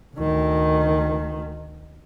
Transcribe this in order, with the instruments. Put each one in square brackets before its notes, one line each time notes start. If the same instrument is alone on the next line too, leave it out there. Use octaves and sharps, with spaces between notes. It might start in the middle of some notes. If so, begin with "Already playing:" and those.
[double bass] D2 D#3